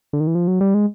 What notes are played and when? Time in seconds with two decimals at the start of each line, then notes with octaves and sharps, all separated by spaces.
0.13 D3
0.20 D#3
0.27 E3
0.35 F3
0.47 F#3
0.61 G3
0.74 G#3